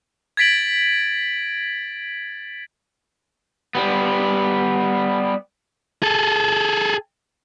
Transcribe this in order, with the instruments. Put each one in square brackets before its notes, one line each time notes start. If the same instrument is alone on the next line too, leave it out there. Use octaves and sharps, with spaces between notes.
[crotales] G#6 A6 B6 D7 F#7
[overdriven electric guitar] G3 B3
[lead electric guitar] G#4 A4